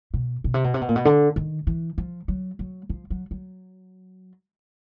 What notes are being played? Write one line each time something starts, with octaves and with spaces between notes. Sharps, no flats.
B2
B2
C3
B2
C3
B2
A#2
B2
D3
D#3
E3
F3
F#3
F#3
F3
F#3
F#3